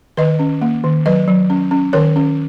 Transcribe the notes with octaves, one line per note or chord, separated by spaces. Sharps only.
D#3 B4 D#5
C#4
A#3
D#3
F#3 B4 D#5
F#3
C#4
C#4
D#3 A#4 C#5
C#4